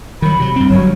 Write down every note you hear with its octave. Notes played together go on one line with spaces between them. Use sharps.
D#3 F#3 B5
C3 F#3
G2 C4
G1 G2 F#3 C#5